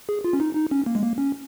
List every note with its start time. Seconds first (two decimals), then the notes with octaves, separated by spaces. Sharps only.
0.09 G#4
0.24 F4
0.33 C#4
0.40 D#4
0.55 D#4
0.71 C#4
0.86 A#3
0.95 G#3
1.02 A#3
1.18 C#4